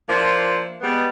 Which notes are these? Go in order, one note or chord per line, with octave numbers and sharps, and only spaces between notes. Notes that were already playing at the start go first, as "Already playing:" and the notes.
F3 A#3 D4 E4 F4
G3 G#3 B3